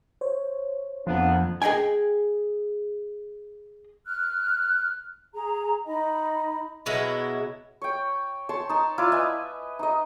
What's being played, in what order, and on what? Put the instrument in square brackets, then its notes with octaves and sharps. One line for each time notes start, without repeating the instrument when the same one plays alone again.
[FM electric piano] C5 C#5
[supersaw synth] F2 [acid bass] F3 [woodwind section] A#3 B3 D4
[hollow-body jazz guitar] G#4 D#5 F5 G5 G#5
[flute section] F6 F#6
G#4 A#5
D#4 D#5 B5
[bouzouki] B2 F#3 G#3 E4
[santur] C#5 G5
C#5 A5 C6
D#4 A5
E4 F4 D5 F5
B4 D#5 E5 G#5
D#4 D#5